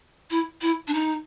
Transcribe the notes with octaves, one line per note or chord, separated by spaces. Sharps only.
E4
E4
D4
D#4